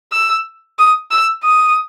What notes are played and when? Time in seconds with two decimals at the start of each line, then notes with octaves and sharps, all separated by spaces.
0.12 E6
0.79 D#6
1.11 E6
1.44 D#6